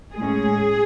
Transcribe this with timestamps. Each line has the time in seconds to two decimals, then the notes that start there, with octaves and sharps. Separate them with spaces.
0.16 A2 G#3 C#4 G#4